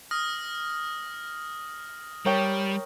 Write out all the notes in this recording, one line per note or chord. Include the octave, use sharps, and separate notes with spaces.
D#6 F6 A#6
G3 A#4 C#5 G5